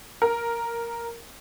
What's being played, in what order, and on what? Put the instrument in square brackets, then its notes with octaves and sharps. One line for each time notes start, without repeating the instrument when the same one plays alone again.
[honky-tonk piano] A#4